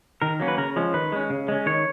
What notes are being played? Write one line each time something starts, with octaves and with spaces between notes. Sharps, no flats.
D#3 A#4
F#3 A#3 C#4
B4
C#3 A#4
F3 G#3 C#4
D#3 B4
G#3 C#4
C#3
G#3 C#4
D#3 C#5